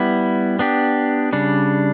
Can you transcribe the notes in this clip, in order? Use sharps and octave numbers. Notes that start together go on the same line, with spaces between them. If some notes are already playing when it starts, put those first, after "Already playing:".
Already playing: G3 B3 E4
B3 D4 G4
C#3 G3 D4